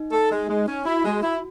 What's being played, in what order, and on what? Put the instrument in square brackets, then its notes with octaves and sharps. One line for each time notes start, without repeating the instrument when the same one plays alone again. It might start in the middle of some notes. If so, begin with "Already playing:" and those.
Already playing: [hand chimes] D#4
[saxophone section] A4
G#3
G#3
C#4
[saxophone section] E4 [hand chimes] F#4
[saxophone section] G#3
E4